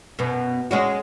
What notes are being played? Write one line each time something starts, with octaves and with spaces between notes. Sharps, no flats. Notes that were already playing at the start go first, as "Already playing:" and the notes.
F#2 B2 B3
G#3 C#4 F#4